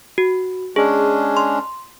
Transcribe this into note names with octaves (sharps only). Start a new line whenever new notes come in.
F#4
G#3 C#4 D4 G#4
C6